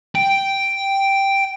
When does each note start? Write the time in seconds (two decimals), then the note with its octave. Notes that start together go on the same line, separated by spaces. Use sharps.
0.15 G5